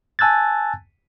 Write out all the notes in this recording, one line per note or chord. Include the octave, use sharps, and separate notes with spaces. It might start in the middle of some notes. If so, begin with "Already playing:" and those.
G#5 A5 E6 F#6 G#6 A6